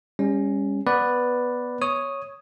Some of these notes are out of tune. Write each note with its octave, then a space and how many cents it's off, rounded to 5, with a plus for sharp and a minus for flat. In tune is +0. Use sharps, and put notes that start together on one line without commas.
G3 +40 C#4 +0
B3 -5 B4 +0 D5 +0
C#5 +0 D#6 +0